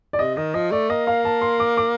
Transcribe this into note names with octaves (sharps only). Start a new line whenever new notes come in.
D5
C3 D#5
D#3 D#5
F3 D#5
A3 D5
A#3 D#5
F5
A5
C6
D6
D6